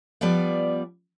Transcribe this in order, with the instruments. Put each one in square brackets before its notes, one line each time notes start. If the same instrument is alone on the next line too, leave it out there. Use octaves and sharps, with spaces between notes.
[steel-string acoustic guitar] F3 G3 B3 B4 D5